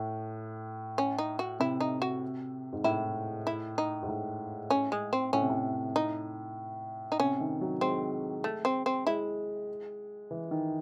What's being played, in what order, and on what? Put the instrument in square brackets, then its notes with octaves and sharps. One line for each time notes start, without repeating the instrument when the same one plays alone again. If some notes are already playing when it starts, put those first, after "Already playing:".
Already playing: [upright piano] A2
[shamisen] C#4
D#4
F#4
[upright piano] C3 [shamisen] E4
[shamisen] D#4
F#4
[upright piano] G#2
[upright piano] A2 [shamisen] E4
[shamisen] E4
D#4
[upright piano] G#2
A2
[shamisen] C#4
G#3
C4
[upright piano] A2 [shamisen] C#4
[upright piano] C3
A2
[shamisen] D#4
D#4
[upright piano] C3 [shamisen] C#4
[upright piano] D#3
F#3
[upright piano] G#3 [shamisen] C4
[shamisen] A3
C4
C4
[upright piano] G#3 [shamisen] E4
[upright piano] E3
D#3